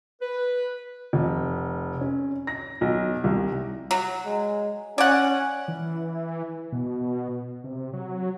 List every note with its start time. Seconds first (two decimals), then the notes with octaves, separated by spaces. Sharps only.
0.22 B4
1.13 F1
2.01 C#4
2.47 A#6
2.81 B1
3.24 C2
3.91 F#3
4.26 G#3
4.98 C#4 D5 F#5
5.68 E3
6.72 B2
7.64 C3
7.93 F#3